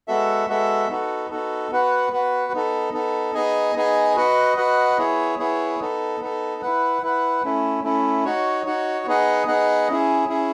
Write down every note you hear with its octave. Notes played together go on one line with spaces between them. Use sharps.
G#3 B3 F#4 A4 E5
G#3 B3 F#4 A4 E5
B3 D#4 F#4 A4
B3 D#4 F#4 A4
B3 F#4 B4 F#5
B3 F#4 B4 F#5
B3 D#4 A4
B3 D#4 A4
B3 D#4 G#4 D#5 G#5
B3 D#4 G#4 D#5 G#5
F#4 B4 D#5 F#5
F#4 B4 D#5 F#5
B3 E4 G#4 C#5
B3 E4 G#4 C#5
B3 D#4 A4
B3 D#4 A4
E4 B4 F#5
E4 B4 F#5
A3 C#4 E4
A3 C#4 E4
D#4 F#4 C#5
D#4 F#4 C#5
B3 D#4 G#4 D#5 F#5
B3 D#4 G#4 D#5 F#5
C#4 E4 G#4
C#4 E4 G#4